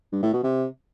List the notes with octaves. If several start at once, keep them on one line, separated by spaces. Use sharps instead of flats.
G2
A2
B2
C3